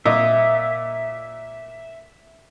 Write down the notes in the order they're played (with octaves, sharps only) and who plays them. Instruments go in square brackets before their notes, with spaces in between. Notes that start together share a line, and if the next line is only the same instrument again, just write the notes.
[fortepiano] A#2 D#5 [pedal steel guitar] E5